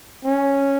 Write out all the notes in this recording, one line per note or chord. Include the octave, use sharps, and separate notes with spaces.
C#4